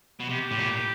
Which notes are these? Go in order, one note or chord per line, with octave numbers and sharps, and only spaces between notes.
B2
C3 G4
A2
A#2